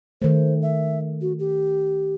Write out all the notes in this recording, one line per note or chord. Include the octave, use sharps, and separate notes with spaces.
D#3 A3 C5
E5
F#4
G4